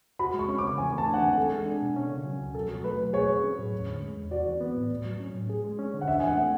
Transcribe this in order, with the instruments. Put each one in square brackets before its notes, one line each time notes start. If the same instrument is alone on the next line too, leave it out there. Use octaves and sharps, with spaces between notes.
[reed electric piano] F#4 [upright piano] B5
[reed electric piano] G#3
[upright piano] C#6
[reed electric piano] C#4
[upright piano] D6
[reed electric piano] C#3
[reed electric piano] E3 [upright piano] G#5
[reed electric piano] A3 [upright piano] A5
[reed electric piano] D4
[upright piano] F#5
[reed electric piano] E3 [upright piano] G#5
[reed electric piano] A4
G#3
D4
B2
C#4
C#3
F#3
C#2
[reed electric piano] B2 [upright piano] A4
[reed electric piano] F#3
[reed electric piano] A3 [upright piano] B4
[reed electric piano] B2
[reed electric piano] G#4 [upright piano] C#5
[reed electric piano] F#3
C#4
A2
E2
D3
G#3
E2
[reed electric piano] F#4 [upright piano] D5
[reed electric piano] E3
B3
A2
A2
F#3
C#4
A2
G#4
G#3
C#4
D3
[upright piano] F#5
[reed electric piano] D4 [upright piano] E5
[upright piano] G#5
[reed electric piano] E3 [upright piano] F#5
[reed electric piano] A3